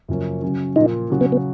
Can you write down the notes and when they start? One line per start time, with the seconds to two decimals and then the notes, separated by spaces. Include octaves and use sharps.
0.08 F#2 C#3 F3 A#3 C#4
0.42 C#3 F#3 C#4
0.76 A#2 F3 A#3 D#4 F4
1.10 C#3 F#3 C#4 F#4
1.21 B3
1.32 B3